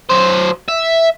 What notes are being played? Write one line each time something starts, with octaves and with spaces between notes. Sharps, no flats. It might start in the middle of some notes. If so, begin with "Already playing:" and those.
F#3 C5
E5